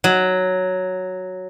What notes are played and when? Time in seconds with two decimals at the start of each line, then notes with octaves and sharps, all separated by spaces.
0.04 F#3